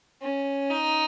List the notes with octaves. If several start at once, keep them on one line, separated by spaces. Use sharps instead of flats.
C#4
D#4